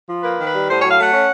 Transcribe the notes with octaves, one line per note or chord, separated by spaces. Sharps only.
F3
A#3 B4
D#3
B4
G3
A2 C5
F#3 C#5
F5
A3 F#5
C#4